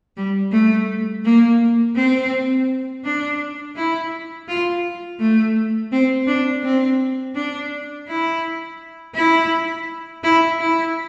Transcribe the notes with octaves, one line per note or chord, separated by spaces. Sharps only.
G3
A3
A#3
C4
D4
E4
F4
A3
C4
D4
C4
D4
E4
E4
E4
E4